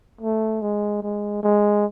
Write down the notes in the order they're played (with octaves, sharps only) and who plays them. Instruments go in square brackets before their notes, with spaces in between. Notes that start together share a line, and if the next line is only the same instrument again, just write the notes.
[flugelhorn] A3
G#3
G#3
G#3